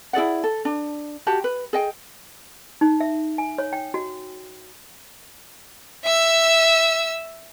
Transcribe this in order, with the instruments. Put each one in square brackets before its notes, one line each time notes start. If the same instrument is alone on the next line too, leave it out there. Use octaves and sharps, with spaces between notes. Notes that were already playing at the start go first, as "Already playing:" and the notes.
[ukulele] E4 G#4 D5 F#5
A4
D4
F#4 G4 A5
B4
G#4 D#5 G5
[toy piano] D#4
E5
G#5
C#5
G5
F#4
[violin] E5 E6